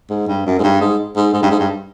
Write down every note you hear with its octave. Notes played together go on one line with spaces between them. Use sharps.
G#2
G2
F#2
G#2
G2
G#2
G#2
G#2
G2
G#2
G2